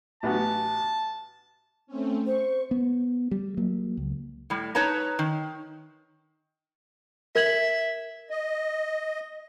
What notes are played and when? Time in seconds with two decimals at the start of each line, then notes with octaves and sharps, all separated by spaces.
0.23 A1 B3 F#4 A5
1.87 A3 C4 C#4
2.27 C5 C#6
2.71 B3
3.31 G3
3.57 F#3 A#3
3.97 C#2
4.50 A2 G3
4.75 D#4 B4 C#5 A5 A#5
5.19 D#3
7.35 A#4 E5 G#6 F#7
8.30 D#5